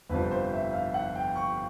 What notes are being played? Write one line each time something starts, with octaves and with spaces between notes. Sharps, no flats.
G1 F2 C3 F3 B4
C5
E5
F5
F#5
G5
C#6